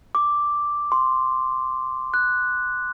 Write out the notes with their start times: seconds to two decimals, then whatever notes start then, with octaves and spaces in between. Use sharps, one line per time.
0.15 D6
0.92 C6
2.14 F#6